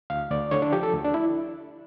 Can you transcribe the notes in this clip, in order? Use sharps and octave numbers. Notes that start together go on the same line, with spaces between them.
D2 F5
D2 D5
D3 C#5
D4
F3 G4
A4
D2
D4
E4